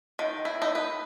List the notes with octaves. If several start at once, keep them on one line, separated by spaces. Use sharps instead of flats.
D#3
E4
D#4
B4